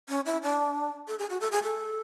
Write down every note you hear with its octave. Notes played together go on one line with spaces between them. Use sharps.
C#4
E4
D4
A4
G#4
F#4
A4
G#4
A4